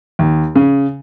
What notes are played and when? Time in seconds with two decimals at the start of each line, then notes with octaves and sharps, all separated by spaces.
0.19 D#2
0.55 C#3